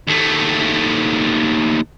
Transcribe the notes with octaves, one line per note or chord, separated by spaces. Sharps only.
D#2 A3